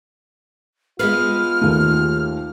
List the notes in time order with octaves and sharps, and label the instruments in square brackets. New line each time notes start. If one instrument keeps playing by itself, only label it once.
[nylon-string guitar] G#3 B3 B4 [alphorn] F4 [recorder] F6
[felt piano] D#2 A3